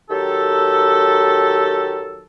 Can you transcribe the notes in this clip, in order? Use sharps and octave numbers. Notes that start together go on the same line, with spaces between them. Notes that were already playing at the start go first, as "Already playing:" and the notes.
D#3 F#3 G4 A4